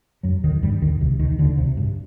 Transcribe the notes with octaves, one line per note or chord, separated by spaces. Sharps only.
F#2 F#3
D#2 D#3
G2 G3
D#2 D#3
C2 C3
D#2 D#3
D2 D3
C2 C3
G2